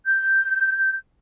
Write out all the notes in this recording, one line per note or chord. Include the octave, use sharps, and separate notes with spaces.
G6